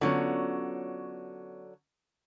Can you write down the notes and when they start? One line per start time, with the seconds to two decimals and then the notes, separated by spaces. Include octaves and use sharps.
0.01 D3 F#3 B3 C#4 F4 C#5